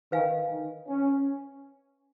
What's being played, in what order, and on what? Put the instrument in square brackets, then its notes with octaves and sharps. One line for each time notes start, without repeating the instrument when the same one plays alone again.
[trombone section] D#3 [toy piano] B4 F5 G#5
[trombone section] D#3
C#4